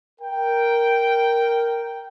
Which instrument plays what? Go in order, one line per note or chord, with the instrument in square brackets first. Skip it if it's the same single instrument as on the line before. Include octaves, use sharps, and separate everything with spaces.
[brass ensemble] A#4 G5